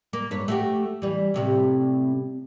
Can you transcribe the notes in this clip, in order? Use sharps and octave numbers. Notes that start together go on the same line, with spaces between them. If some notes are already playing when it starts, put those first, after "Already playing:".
A#3
G2 B4 C#5
A3 F#4 G4
E3 G3
A2 C3 G3